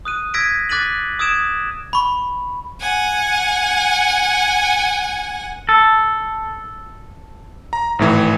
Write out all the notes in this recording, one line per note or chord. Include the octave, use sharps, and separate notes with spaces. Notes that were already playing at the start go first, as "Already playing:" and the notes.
D#6 F#6 D#7
E6 G#6 A#6 B6 D7 D#7
D6 F#6 A6 B6 D#7 F#7
D#6 E6 G#6 D7 E7
B5 C#6
F#5 G#5
A4
A#5
G#1 A2 E3